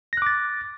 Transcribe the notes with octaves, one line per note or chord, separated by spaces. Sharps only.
D6 F#6 A6 A#6